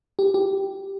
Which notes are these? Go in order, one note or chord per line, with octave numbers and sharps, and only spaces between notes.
G4
G4